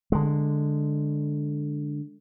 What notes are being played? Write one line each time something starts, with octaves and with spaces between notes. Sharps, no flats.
D3 G#3